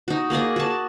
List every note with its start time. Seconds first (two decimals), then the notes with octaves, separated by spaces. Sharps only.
0.08 D#4 F#4
0.30 A#3 G#4 D5 D#5
0.56 F#4 A5